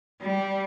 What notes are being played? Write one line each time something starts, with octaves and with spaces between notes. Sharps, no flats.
G3